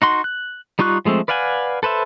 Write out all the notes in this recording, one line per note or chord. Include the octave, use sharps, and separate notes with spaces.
D#4 F#4 C6
F#6
G3 D#4 F4 C#6 F#6
F3 G#3 A3 C4
B4 D5 F5 F#5 G#5
A4 B4 C5 E5